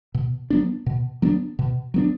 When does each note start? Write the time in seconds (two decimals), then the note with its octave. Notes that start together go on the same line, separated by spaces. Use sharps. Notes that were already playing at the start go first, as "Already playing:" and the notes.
0.14 B2
0.50 F#3 B3 D4
0.86 B2
1.22 F#3 B3 D4
1.59 B2
1.94 F#3 B3 D4